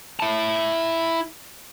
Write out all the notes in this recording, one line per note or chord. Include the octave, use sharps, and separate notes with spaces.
E4 A5